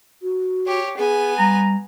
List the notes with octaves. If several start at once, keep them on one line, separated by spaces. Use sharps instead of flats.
F#4
G4 C#5
B3 G#4 G#5
G3 A#5